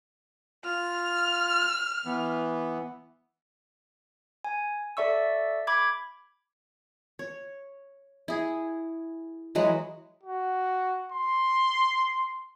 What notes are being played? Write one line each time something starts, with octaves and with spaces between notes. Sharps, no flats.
F4 F6
E3 B3
G#5
A4 D5 E5 C#6 E6
B5 D6 G#6
C#5
E4 G#4
E3 F#3 G#3 B4
F#4
C6